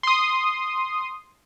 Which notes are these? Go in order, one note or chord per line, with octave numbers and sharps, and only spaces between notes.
C6 D#6